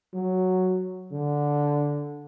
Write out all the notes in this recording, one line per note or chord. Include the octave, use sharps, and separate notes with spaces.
F#3
D3